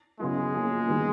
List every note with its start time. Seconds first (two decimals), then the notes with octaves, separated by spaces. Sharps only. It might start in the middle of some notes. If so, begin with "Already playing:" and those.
0.19 C#3 F#3 G#3 B3 E4
0.54 F3 A#3 C#4 F4 G#4
0.88 D#3 G3 B3